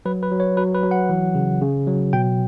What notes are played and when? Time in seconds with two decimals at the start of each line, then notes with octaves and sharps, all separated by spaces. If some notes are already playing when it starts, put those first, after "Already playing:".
0.06 F#3 B4
0.23 B4
0.31 F#3
0.40 C#5
0.57 F#3 B4
0.74 B4
0.83 F#3
0.91 F#5
1.09 E3
1.35 C#3
1.61 C#3
1.87 F#3
2.13 B2 G5